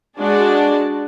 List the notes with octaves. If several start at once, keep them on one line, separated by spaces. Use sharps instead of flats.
G#3 D4 F#4 G#4 D5 A5